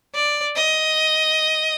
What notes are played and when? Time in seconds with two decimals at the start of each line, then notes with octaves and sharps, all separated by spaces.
0.15 D5
0.56 D#5